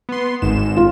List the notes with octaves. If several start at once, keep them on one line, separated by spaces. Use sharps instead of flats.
B3 C6
G#1 G#2 E7
F4